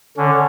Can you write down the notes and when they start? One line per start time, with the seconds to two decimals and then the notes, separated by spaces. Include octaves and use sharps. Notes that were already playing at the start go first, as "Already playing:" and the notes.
0.17 D3 C#4